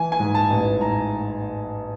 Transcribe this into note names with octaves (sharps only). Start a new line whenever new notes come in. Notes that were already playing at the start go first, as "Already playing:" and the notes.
Already playing: E3 G#5
G#5
G#2
A5
A1
G#2 A#5